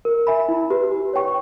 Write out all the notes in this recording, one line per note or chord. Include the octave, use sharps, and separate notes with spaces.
A#4
E5 G#5 B5
E4
G4 B4
G4
C#5 G5 C#6